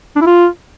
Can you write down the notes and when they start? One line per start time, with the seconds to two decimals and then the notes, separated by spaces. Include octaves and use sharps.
0.16 D4
0.21 E4
0.27 F4